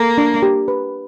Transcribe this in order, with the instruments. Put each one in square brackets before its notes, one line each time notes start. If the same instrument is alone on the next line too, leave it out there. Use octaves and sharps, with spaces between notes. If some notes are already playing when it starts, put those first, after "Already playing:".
Already playing: [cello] A#3 [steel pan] A4
[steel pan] D4
G4
B4